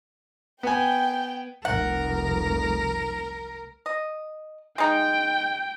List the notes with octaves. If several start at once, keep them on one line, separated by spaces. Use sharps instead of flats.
B3 G5 G#5
F1 C2 F2 A#4 F#5
D#5
G#3 D#4 G5